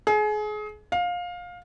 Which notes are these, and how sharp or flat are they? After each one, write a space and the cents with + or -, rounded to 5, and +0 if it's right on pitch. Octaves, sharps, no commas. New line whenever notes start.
G#4 +30
F5 +20